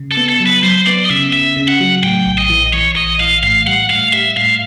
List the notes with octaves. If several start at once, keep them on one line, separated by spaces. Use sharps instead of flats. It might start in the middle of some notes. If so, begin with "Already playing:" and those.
Already playing: C#3
A4
B3
A4
F#3
B4
F#3 C5
B3 D5
D#5
C#3 E5
C#3 E5
C#3
F#5
F#3
A2 G5
A#1
D#5
E3
E3 C#5
A#1 D#5
E3 F5
A2 F5
G3 F#5
A2 F5
G3 E5
A2 F5